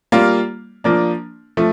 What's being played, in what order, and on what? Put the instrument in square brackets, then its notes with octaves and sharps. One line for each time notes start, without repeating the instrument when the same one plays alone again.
[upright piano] G3 A#3 F4
F3 A#3 D4
F3 A3